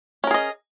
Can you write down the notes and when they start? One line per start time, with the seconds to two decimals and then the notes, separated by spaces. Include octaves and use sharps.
0.24 C#4
0.27 A#4
0.31 G#4
0.34 D#5